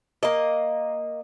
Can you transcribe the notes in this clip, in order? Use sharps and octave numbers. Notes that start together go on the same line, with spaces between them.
A#3 D#5